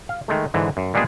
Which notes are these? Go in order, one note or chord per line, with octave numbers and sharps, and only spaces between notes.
F5
D#3 G#3 A3
G#2 D3 E3
F#2
A#2 G3 G#3 B3 D4 G#4